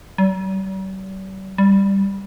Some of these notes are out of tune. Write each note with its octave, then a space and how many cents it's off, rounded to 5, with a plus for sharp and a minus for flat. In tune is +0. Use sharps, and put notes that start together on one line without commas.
G3 -45
G3 +5